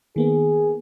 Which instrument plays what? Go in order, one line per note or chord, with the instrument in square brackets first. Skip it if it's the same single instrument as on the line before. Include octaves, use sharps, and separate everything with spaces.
[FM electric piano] D#3 A#3 B3 [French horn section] G#4